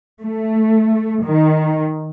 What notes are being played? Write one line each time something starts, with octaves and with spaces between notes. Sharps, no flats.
A3
D#3